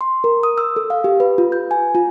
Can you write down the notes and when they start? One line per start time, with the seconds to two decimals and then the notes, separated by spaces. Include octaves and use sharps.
0.01 C6
0.24 A#4
0.43 D#6
0.58 E6
0.76 A4
0.90 F5
1.04 G4
1.20 B4
1.38 F4
1.52 G6
1.71 G#5
1.95 F4